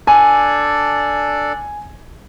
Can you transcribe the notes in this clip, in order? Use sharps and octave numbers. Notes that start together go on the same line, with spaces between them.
D4 A4 D5 G#5